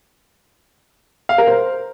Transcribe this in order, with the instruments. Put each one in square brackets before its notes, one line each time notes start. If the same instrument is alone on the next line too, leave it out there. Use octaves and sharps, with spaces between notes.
[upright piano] F5
A#4
C5